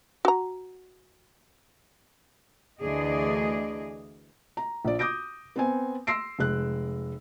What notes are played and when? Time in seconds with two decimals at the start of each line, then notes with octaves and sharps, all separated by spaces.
0.25 F#4 A#5
2.80 D2 E3 G#4 D5 D#5
4.57 A#5
4.85 A#1 D5
4.99 D6 D#6 G6 A#6 D7
5.56 B3 C4 G#5
6.07 C6 E6 A#6 C7 D7
6.39 F1 G#3 F#6